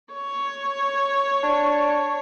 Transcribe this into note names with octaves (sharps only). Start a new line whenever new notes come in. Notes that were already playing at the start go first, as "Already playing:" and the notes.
C#5
D4